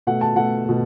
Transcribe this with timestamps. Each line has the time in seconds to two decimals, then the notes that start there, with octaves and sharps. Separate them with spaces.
0.07 B2 A3 F#5
0.21 A5
0.35 B2 A3 F#5
0.64 B2 A3